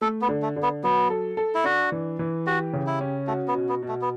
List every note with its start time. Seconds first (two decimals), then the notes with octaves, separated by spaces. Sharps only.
0.01 A3 A4
0.22 B3
0.29 D3
0.42 A3
0.56 D3
0.63 B3
0.83 F#3 B3
1.10 A4
1.37 A4
1.55 E4
1.64 D4 F#4
1.92 E3
2.19 E3
2.47 F#4 G4
2.73 C#3
2.87 E4
3.01 C#4
3.27 A3 F#4
3.48 B3
3.55 B2
3.69 B3
3.82 B2
3.88 A3
4.02 B3